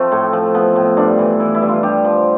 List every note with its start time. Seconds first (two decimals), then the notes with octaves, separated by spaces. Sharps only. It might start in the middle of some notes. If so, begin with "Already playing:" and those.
Already playing: F3 A3 C4
0.12 A2
0.33 F3
0.54 F3 B3
0.76 A2
0.97 G2 D4
1.19 E3
1.40 E3 E4
1.55 E4
1.62 G2
1.69 F4
1.83 G2 G4
2.04 F3